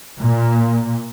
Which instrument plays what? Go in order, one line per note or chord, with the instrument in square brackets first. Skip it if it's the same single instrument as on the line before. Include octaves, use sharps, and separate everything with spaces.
[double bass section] A#2